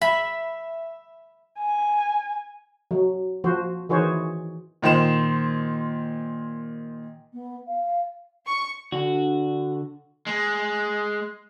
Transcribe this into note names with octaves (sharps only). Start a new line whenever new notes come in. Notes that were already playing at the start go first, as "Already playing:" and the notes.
E5 B5
G#5
F#3
F3 F#4 C5
D#3 E3 F#4 G#4 C5 C#5
A#2 D#3 C5 C6 E7
B3
F5
C#6
D3 F#4
G#3